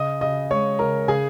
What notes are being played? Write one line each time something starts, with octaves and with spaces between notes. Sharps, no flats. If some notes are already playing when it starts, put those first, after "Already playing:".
Already playing: C#3 D#5 D#6
C#3 D#5 D#6
G#3 C#5 C#6
C#3 A#4 A#5
C#3 G#4 G#5